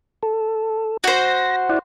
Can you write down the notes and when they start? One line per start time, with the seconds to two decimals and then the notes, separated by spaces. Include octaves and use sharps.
0.23 A4
1.04 F#4 C5 A#6
1.69 E4 D5 F#5